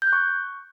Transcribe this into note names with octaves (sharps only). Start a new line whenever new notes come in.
G6
F#6
C#6